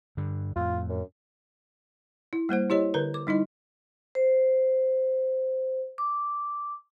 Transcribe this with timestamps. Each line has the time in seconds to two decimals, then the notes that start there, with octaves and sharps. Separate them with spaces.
0.17 G2 D3
0.56 F2 A2 F4
0.89 F#2
2.33 E4
2.49 G3 A#3 C5 F#5
2.70 E4 G4 C#5 D#5
2.94 D3 A#4 B4
3.14 D6
3.27 G3 D#4 E4 D#5
4.15 C5
5.98 D6